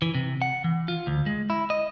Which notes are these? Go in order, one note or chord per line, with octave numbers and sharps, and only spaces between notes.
E3
C3
F#5
E3
F4
D2
G#3
E4
D#5